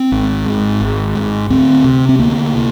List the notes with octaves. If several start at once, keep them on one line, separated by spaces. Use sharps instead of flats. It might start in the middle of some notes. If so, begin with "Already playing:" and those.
Already playing: C4
G#1
G#2
G#1
G#2
D2 C4
C3
C4
D2 A#3
C3